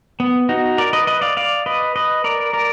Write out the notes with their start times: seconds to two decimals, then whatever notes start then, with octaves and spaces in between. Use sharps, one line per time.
0.20 B3
0.49 D#4 F#4
0.78 A#4 D5
0.93 B4 D#5
1.07 B4 D#5
1.21 D5 F5
1.37 D5 F5
1.66 B4 D#5
1.96 B4 D#5
2.24 A#4 D5
2.53 A#4 D5